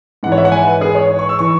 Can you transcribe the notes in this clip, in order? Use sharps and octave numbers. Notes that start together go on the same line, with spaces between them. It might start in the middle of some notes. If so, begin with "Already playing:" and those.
G#2 E3 F#5
C#5
E5
F#5
G#5
B4
G#4
C#5
C#6
E6
E3 C#6